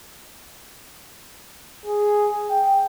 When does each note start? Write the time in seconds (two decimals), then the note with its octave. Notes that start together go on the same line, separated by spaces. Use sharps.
1.86 G#4
2.50 G5